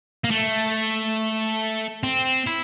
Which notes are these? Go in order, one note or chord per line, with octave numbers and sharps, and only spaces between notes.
A#3
A3
C4
E4